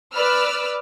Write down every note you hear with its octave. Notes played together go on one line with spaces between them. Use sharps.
B4 D5 E6 F6